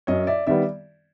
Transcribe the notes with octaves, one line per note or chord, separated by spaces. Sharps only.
F#2 C#5 D#5
D5 E5
D#3 G3 B3 D5 E5